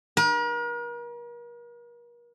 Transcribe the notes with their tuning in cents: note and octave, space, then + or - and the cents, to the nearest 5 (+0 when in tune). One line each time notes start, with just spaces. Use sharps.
A#4 +40